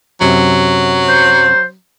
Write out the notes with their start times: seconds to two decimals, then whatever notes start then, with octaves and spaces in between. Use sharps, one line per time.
0.21 F#2 C3 F#3
1.09 C5